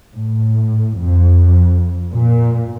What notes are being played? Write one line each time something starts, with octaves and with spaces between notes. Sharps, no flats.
A2
F2
A#2